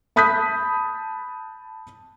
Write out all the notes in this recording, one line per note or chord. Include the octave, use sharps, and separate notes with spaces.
A5 B5 D#6 F#6 G6 B6